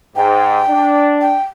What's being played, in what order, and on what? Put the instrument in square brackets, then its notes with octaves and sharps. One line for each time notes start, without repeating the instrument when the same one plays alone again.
[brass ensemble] G#2 [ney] G5
[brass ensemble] D4
[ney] G5